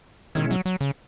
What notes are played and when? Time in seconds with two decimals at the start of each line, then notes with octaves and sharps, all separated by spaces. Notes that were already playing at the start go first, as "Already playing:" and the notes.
0.35 B2 D#3 G#3 C#4 E4
0.51 F#3
0.66 F#3
0.81 C#3